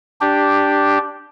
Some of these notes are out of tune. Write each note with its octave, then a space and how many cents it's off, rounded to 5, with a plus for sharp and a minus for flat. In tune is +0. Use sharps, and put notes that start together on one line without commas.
D4 +0 G4 +0